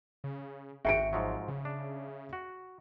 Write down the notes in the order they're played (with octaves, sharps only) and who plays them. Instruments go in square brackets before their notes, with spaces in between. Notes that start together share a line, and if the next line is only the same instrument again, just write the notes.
[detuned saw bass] C#3
[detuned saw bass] G#1 [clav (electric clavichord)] F#4 G5 [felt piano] E5 C#7 D7
[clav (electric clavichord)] G#2 F3 F#3
[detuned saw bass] C#3
[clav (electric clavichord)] D4
F#4